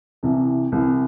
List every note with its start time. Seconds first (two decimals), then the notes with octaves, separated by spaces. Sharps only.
0.23 C2 C3 E3
0.72 C2 C3 E3